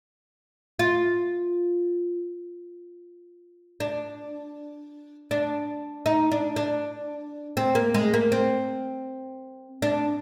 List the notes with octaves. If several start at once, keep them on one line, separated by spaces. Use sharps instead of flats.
F4
D4
D4
D#4
D4
D4
C4
A#3
G#3
A#3
C4
D4